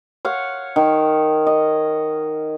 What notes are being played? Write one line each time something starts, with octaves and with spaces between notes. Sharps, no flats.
C#5 F5 F#5
D#3
D#5